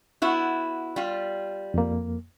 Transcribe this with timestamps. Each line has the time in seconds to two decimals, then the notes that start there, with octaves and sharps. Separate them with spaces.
0.22 B3 E4 F#4
0.96 G3 F4
1.74 F2 A#3